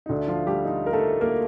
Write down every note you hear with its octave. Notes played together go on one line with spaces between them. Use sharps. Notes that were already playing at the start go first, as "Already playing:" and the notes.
D#4
D2 D3 A3 D4
F3 F4
G3 G4
D#4
A#4
A3 A4
A#3 A#4